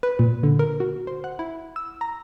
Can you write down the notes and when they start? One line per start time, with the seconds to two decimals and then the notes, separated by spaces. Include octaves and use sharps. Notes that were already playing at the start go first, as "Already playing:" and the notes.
0.03 B4
0.19 A#2
0.43 D3
0.59 A#4
0.80 F#4
1.07 C5
1.24 F#5
1.39 E4
1.76 E6
2.01 A#5